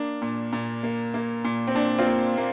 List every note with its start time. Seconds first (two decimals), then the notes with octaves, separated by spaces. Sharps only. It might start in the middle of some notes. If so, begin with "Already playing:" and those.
Already playing: A#3 D4
0.22 A#2
0.53 A#2
0.83 A#3
1.14 A#3
1.45 A#2
1.67 C4
1.75 A#2 D4
1.98 C4 F4
2.06 A#3
2.37 A#3